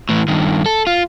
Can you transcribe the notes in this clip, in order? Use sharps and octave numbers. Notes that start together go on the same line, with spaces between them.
A2 E3
G2 D#3
A4
F4